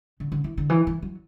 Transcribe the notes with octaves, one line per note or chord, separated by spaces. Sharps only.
D3
D3
E3
D3
E3
E3
F#3